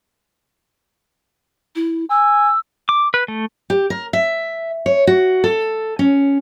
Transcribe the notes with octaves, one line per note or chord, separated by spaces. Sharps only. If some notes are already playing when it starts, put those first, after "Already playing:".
E4
G#5 E6
D6
B4
A3
G4
A#4
E5
C#5
F#4
A4
C#4